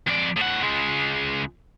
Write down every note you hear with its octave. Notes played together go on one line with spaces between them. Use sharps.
F2 D5
A2 F#5
C#2 G#3